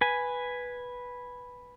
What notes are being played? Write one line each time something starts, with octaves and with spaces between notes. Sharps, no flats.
B4 G#5